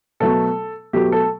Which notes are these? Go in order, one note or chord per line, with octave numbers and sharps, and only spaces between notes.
B2 F#3 A3 A4
B2 F#3 A3 G4
A4